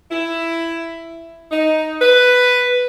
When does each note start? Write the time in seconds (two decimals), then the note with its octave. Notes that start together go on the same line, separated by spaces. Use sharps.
0.11 E4
1.51 D#4
2.01 B4